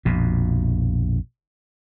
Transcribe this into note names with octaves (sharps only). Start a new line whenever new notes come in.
A#1 F2 B2